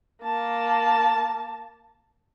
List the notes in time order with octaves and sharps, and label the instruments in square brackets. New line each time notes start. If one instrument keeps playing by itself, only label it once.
[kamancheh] A#3 A5